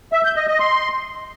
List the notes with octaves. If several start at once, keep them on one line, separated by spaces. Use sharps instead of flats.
E5
G6
D#5
D#5
C6